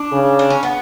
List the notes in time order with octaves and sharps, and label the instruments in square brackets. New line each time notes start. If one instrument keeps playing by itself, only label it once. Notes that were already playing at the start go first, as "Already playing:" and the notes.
Already playing: [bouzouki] D4
[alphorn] C#3
[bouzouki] D4
C#4
B3